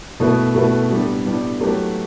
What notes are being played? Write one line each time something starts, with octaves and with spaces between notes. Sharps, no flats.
B2 A3 E4 B4
B2 A3 E4 B4
A2 G3 B3 D4 G4
A2 G3 B3 D4 G4
F#3 A3 E4 G4 B4